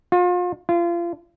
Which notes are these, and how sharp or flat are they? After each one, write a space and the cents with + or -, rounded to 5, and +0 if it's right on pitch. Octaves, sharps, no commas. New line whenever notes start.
F4 +35
F4 -30